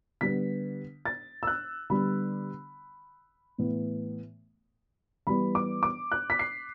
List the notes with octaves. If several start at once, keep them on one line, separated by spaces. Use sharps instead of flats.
D3 G3 B3 B6
A6
E6
F#6
D3 G3 B3 B5
A2 E3 B3
E3 G3 B3 B5
D6
D6
F#6
B6
C7